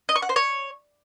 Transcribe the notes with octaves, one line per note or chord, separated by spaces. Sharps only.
D#5
C#6
F#5
C5
C#5